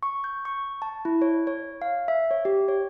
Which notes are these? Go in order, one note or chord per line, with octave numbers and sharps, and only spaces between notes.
C#6
G6
C#6
A5
E4
C#5
C#5
F5
E5
C#5
G4
C#5